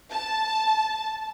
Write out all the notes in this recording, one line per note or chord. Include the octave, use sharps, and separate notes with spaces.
A5